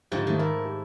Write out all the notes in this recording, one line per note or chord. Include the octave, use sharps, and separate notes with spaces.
C#2 G#2 D3 F3 A3 G4
D#3 G3 A3
E4 A#4
G4